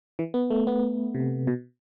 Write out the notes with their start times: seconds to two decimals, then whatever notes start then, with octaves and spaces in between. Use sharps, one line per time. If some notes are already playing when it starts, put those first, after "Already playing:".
0.19 E3
0.34 B3
0.50 A3
0.67 B3
1.15 C3
1.47 B2